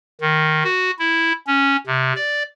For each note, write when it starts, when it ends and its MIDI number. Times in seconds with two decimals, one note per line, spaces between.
0.21 0.63 51
0.64 0.91 66
0.99 1.33 64
1.47 1.76 61
1.87 2.13 48
2.16 2.43 74